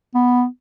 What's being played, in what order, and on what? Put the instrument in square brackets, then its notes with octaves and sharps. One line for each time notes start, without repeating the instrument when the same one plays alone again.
[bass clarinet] B3